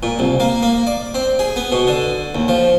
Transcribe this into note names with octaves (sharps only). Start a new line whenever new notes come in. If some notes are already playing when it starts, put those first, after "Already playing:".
A#2
C2
A#3
A#3
D5
C4
G#4
B3
B2
D3
D#2
F3